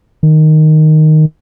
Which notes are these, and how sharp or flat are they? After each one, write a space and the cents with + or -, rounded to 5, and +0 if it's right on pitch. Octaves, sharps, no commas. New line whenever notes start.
D#3 -5